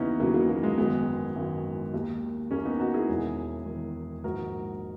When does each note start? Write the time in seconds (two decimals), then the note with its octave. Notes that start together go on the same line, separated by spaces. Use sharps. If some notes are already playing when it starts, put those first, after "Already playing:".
Already playing: D#2 C#3 E3 B3 C#4 D#4 E4
0.20 D#2 C#3 E3 F#3 A#3
0.34 F#3 A#3
0.49 F#3 A#3
0.63 G#3
0.78 G#1 F#2 D#3 G#3 B3
1.36 G#1 F#2 D#3
1.94 D#2 D#3
2.51 D#2 D#3 A#3 C#4
2.65 B3 D#4
2.80 D#4 F#4
2.94 E4 G#4
3.09 E1 E2 D#3
3.66 E1 E2 D#3
4.24 A#1 G#2 D#3 F#4 A#4